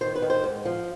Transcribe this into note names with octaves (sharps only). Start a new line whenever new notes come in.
D#3 C5
B4
D#3
C5
G#2
F3